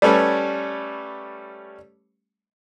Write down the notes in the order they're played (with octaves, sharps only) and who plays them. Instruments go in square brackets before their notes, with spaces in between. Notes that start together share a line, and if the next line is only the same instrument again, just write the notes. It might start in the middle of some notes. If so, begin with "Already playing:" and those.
[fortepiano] G3 A3 C#4 B4 C#5